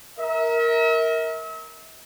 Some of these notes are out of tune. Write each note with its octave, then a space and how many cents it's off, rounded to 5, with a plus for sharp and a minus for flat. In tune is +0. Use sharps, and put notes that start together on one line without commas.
A#4 +0 E5 -40